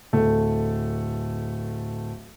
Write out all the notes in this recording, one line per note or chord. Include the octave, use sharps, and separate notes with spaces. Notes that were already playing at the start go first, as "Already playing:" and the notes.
D1 A3